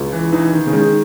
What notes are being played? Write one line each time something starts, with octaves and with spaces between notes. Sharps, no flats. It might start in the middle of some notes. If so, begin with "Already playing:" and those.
Already playing: C#2
E3
E3 D#4
D#3
C#3
D#3 G#3